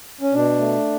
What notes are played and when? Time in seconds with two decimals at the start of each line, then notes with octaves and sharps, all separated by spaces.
0.21 C#4
0.33 B2 D4
0.59 A3